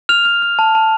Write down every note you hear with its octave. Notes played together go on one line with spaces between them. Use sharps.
F6 F7
F6
F6
A5
A5